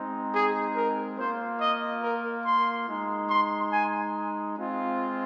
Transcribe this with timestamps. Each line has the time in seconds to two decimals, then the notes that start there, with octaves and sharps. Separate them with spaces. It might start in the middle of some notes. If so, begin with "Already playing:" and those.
Already playing: G#3 C4 D#4
0.32 G#4
0.75 A#4
1.17 A#3 F4 C5
1.60 D#5
2.03 A#4
2.44 C6
2.87 G#3 D#4
3.29 C6
3.72 G#5
4.56 G#3 C4 F4